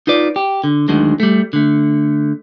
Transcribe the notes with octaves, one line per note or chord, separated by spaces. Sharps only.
D#4 F4 B4 D5
G4
D3
D2 D3 D#3 F#3 G#3
G3 A3
D3 A3